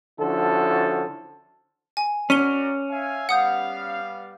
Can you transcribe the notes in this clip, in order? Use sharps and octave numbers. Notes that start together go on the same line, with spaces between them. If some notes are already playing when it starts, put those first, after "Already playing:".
D3 F3 C#4 E4 F#4 A4
G#5
C#4 F#4 A#4 D5 B6 D#7 G7
E5 F5 G#5
G3 B3 F5 F#5 D#6 G6